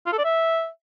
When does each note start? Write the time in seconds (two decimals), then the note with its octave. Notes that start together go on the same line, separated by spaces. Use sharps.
0.06 F4
0.12 A4
0.18 D5
0.24 E5